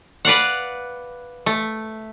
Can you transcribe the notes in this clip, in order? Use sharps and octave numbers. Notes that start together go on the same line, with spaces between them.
B4 D5 F5 F#5
A3